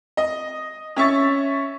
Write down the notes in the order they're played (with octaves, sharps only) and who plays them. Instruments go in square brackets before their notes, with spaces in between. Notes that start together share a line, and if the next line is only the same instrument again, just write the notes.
[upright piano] D#5
C#4 E5 C#6 A6